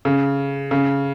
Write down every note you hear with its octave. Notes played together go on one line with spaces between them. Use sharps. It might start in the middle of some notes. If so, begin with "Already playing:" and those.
C#3
C#3